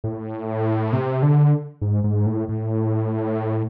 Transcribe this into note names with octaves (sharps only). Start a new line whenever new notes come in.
A2
C3
D3
G#2
G#2
A2
A2